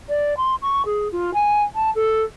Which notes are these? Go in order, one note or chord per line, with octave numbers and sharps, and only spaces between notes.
D5
C6
C#6
G#4
F4
G#5
A5
A4